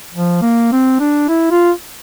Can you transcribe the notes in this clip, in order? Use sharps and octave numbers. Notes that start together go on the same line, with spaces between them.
F3
A#3
C4
D4
E4
F4